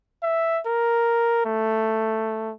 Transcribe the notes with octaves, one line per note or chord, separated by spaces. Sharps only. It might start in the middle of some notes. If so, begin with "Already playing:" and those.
E5
A#4
A3